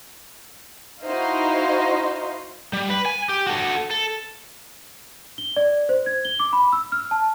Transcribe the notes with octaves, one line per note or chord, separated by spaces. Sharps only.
D#4 E4 F#4 C5 D#5 F5
G3
B4
G#5
G4
F#4 A4
A4
G7
D5
C5
G#6
G7
D6
B5
E6
F6
A5